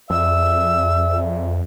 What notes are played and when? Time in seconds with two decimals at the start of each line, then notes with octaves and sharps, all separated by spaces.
0.10 F2 G#4 D5 E5 E6